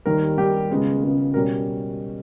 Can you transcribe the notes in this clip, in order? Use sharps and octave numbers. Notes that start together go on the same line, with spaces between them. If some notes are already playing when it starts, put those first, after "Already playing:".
D#2 D#3 G3 A#4
D#2 D#3 G3 G4
C#2 C#3 G#3 B3
C#2 C#3 G#3 B3
B2 G3 C#4 A#4